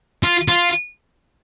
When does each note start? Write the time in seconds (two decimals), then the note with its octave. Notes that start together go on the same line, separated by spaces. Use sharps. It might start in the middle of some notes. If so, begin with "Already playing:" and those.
0.23 F4
0.48 F4